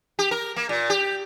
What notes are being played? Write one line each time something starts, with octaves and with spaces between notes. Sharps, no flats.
G4
A#4
A#3
A#2
G4